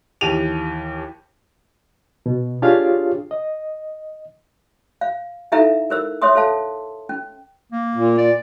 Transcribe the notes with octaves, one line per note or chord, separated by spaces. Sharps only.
D#2 E3 G4 D#7 F7
B2
D4 F4 G4 G#4 C#5 F5
D#5
F5
D#4 E4 A4 E5 F5 A#5
A#4 C5 E6
C5 C#5 E5 C6 D#6
A4 C5 F5 A5
C#4
A#3
A#2
D5